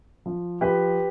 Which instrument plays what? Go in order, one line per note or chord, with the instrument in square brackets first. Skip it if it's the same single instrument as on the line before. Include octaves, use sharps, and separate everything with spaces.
[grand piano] F3
F3 G4 B4